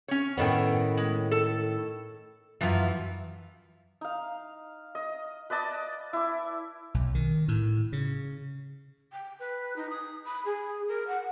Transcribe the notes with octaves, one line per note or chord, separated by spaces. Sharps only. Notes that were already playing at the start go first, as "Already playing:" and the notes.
C#4 C#5
A2 D#3 B3 C#4 A4 G5
G#3
A4
F#2 E3 F3 F4
D#4 F5
D#5
B4 D5 D#5 A5
E4 D6
B1
D#3
A2
C#3
G5
B4
D#4
D#6
B5
G#4
A#4
F#5